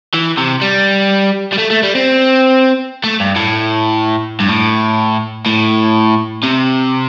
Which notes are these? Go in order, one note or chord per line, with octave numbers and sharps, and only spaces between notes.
E3
C3
G3
G3
A3
A3
G3
C4
A3
G2
A2
G2
A2
A2
C3